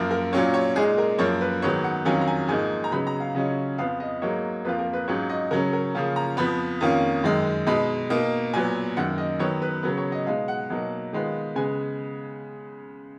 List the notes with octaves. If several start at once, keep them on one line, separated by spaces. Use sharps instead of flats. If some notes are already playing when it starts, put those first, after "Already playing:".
Already playing: F#2 F3 A#3 F4
A#4
A#2 F#3 C#4 F4 C#5
C#5
A#2 G#3 D#4 G#4
A#4
F#2 F3 A#3 C#5
B4
G#2 D#3 F#3 B3 C#5
F#5
F2 D#3 F#3 C#4 F4 G#5
A#5
G#5
G#2 F3 A#3 D#4 G#5
A#5
C#3 F#3 B3 D#4 B5
A#5
F5
C#3 F#3 C#4 F4 D#5
F2 F3 B3 F5
D#5
G#2 F#3 A#3 D#4 C#5
F2 F3 A#3 F4 B4
A#4
B4
G#2 F#3 C#4 F4 C#5
D#5
C#3 F#3 C#4 A#4
A#4
C#3 F3 A#3 C#4 F4
A#5
F2 F3 B3 B5
F2 D#3 A#3 C#4 F4
F#2 D#3 G#3
B2 G#3 D#4 B5
B2 A#3 D#4
A#2 F#3 B3 G#5
F#2 D#3 A#3 F#5
D#5
D#3 F#3 B3 C#5
B4
C#3 F#3 B3 A#4
C#5
D#5
B2 G#3 D#4 F5
F#5
B2 F#3 A#3 D#4
D#3 G#3 B3 F4
C#3 G#3 B3 G#5